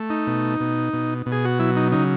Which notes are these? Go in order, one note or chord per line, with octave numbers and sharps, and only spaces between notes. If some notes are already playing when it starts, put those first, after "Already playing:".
Already playing: A3
D#4
B2
B2
B2
B2
G#4
F#4
F#3 E4
D#4
C#3 D#4